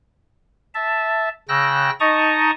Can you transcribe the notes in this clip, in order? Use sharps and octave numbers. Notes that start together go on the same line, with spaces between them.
E5 A5
C#3 G5 E6 F#6 A#6
D#4 D#5 A5 A#5 C#6 D#6